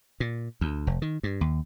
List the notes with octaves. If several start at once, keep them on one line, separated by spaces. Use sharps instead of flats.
A#2
D2
F1
D#3
G2
D#2